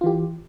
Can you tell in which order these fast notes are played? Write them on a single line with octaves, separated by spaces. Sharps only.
F4 E3 G4